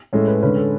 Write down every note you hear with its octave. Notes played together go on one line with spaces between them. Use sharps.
A2 G#3 C#4 A4
B4
D3 G#3 C#4 B4
A4